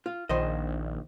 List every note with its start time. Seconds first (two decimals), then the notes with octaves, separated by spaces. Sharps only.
0.06 F4
0.29 A#1 D#3 C5 D#5